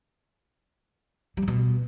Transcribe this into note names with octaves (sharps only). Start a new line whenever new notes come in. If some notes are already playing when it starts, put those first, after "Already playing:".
G3
C#3
B2